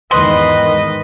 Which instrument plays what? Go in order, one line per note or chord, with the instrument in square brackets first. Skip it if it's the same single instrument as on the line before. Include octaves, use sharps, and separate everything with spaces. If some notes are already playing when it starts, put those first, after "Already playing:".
[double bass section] E2 G#2 D#3 [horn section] B4 D#5 [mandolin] C6